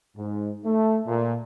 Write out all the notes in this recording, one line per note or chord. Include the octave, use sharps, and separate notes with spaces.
G#2
A3
A#2